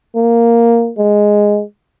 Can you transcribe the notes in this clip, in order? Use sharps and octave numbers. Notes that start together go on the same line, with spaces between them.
A#3
G#3